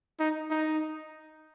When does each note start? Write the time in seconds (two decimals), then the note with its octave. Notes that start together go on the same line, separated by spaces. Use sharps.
0.20 D#4
0.51 D#4